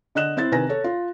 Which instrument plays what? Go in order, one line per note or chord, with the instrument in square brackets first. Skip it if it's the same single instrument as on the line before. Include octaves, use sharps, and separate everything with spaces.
[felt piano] D3 D#5 F#6 E7
C4 E4 C5 A6
C3 D#3 B4 G#5 A#6
A4 C#5
F4